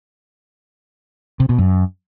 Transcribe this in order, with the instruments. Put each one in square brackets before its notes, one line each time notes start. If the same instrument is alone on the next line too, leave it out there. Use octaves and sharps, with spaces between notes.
[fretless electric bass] C3
B2
F#2